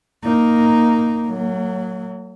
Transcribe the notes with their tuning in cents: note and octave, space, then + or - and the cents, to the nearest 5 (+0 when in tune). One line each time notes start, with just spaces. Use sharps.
A#3 +0 D#4 +0
F#3 +0 A#3 -45